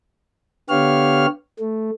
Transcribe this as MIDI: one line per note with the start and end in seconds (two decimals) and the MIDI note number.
0.70 1.26 50
0.70 1.26 59
0.70 1.26 67
0.70 1.26 73
0.70 1.26 77
0.70 1.26 89
1.60 1.91 57